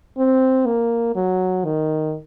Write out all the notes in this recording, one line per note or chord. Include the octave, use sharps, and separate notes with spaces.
C4
A#3
F#3
D#3